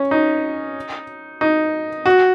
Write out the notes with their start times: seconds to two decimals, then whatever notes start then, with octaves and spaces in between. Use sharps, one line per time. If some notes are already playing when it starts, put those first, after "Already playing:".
Already playing: C#4
0.11 D#4
1.41 D#4
2.06 F#4